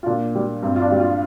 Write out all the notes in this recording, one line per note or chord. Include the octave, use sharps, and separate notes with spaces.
F4
A#2 D4
G3
G2 C4
F4
D4
G3
F4